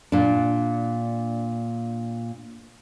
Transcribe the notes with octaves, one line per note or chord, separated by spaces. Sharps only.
A#2 D4